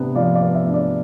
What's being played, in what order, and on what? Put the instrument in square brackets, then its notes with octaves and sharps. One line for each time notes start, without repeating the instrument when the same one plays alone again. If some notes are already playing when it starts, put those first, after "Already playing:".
Already playing: [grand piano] C3 B3 D4
F3 D5 F5
D5 F5
B3
E5
D4
D5